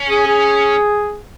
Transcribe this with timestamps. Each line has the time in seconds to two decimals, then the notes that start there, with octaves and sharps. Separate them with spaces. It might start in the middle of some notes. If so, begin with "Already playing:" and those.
Already playing: C#4
0.09 G#4
0.27 G#4